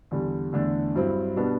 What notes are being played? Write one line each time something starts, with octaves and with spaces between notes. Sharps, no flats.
E2 D3 G3
E2 D3 A3 D4
G2 F#3 C4 E4
B2 G3 B3 D4